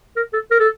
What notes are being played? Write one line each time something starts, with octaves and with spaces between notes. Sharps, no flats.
A#4
A4
A#4
A4